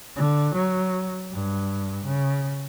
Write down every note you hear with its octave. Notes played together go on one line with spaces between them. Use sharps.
D3
F#3
G2
C#3